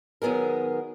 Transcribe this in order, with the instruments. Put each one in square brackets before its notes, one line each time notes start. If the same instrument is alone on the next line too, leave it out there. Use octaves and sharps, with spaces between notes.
[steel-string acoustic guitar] D#3 F#3 B3 G#4 A#4